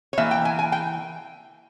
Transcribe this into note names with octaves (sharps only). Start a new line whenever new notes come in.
C#5
E3 A#3 E5
G5
G#5
G#5
G5